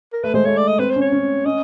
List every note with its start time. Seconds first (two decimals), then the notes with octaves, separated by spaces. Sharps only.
0.13 A#4
0.23 A3 B4
0.34 G#3 C5
0.45 A3 C#5
0.57 D5
0.68 D#5
0.79 C4 B4
0.90 C5
0.96 C#4
1.01 C#5
1.12 C#4
1.46 C#4 D#5